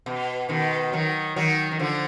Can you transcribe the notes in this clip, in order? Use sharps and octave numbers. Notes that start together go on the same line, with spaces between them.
B2
B2 D#3
D#3 F#3
D#3 F#3
D#3
D3 F3